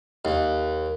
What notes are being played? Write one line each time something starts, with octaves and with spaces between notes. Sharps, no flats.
D#2